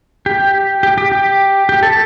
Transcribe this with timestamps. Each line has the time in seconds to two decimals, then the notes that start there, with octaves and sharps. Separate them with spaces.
0.26 G4
0.83 G4
0.98 G4
1.12 G4
1.69 G4
1.83 A4